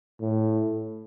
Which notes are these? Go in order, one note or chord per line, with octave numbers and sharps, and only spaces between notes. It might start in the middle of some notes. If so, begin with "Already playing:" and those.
A2